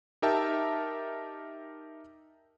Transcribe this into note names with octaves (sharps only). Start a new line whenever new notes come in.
D#4 G4 A#4 E5 G5 A5